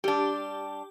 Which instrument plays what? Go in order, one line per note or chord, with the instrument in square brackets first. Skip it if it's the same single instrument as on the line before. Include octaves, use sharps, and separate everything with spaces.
[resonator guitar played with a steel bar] G3 D4 [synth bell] G4